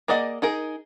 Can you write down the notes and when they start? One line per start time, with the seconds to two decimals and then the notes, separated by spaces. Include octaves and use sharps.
0.08 A#3 G#4 D5 D#5 F#5
0.42 D#4 G#4 A#4